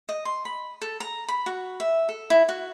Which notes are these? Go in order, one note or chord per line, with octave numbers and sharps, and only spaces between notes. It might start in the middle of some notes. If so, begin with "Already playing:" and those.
D#5
C6
B5
A4
A#5
B5
F#4
E5
A4
E4
F#4